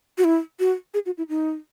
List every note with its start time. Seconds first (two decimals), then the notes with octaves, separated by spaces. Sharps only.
0.18 F#4
0.24 E4
0.59 F#4
0.94 G#4
1.06 F#4
1.18 E4
1.29 D#4